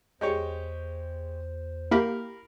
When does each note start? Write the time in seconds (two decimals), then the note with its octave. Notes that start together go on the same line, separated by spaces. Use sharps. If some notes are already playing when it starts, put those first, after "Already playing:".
0.21 E2 G#3 G4 C5 C#5
1.91 A#3 E4 G4 A#4 F5 B5